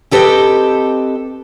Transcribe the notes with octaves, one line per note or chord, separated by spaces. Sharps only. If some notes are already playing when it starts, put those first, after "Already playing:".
C4 G4 A4 B4 D#5 G5